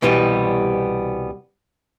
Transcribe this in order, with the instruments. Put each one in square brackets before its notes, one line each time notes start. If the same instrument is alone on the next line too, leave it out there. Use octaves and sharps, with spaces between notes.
[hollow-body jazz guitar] C2 B2 E3 G3 B3